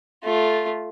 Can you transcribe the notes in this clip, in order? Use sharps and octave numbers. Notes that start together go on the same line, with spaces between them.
A3 F4